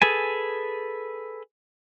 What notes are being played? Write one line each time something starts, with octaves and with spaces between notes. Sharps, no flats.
G#4 A4 B4 G#5